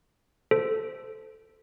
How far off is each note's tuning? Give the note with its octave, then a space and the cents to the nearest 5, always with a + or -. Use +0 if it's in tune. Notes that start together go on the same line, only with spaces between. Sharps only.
A4 +0 C5 -20